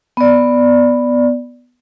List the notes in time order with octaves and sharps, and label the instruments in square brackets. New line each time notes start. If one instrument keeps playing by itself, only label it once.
[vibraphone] B3 D5